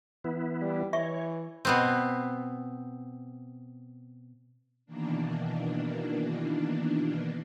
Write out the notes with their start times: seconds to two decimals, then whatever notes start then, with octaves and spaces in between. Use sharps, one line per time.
0.24 E3 B3 E4
0.61 G3
0.93 E3 C#5 E5 C#6
1.65 B2 B3 C4
4.86 B2 D#3 E3 A#3 D4